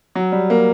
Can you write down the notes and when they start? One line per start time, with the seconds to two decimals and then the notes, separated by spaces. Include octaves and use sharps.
0.15 F#3
0.32 G3
0.50 A#3